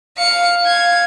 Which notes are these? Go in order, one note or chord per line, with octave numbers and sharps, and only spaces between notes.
F5 C#7
F5 G#6